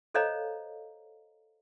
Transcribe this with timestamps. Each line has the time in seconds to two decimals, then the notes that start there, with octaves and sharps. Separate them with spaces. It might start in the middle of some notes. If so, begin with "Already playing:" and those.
0.14 A4 C5 C#5 D#5 F5 A#5